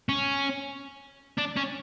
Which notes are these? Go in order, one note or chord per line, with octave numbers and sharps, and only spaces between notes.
C#4
D4
C#4